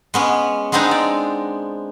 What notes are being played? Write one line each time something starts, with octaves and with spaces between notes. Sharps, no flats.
G#3 B3 C#4
G#3 B3 C4 D4 D#4
D5